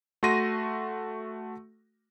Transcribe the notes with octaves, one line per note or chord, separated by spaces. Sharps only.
A3 F#4 C6 A#6 D#7